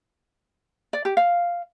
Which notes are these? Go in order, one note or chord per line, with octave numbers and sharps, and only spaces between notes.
D5
G4
F5